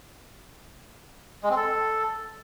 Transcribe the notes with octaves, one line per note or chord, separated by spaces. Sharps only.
G#3
C4
A4